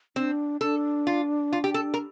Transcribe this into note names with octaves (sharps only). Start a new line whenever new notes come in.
C4 D4
D4 A4
F4
F4
G4
A4
A#4